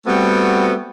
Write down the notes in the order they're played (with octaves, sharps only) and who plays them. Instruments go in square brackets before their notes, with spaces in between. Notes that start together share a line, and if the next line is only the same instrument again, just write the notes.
[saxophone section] G3 A3 B3 C4 F#4